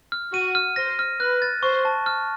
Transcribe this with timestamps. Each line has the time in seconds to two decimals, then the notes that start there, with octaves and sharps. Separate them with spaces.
0.12 F6
0.33 F#4 D#7
0.55 F6
0.76 C5 A#6
0.99 F6
1.20 B4 F#6
1.42 A6
1.63 C5 C#6
1.85 A5
2.06 F6